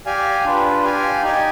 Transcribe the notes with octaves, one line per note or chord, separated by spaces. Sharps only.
G4 D5 F5 G#5
D4 F4 B4
G4 D5 F5 G#5
D#4 G4 D5 G#5